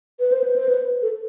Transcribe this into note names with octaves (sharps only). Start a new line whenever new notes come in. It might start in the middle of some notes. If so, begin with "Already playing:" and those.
B4
C5
B4
C5
B4
A4